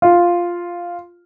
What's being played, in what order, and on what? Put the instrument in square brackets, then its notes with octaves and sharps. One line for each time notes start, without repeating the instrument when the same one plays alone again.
[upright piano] F4